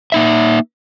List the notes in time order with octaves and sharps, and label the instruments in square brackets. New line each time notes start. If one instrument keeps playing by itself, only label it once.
[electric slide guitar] A#3 D#4 E5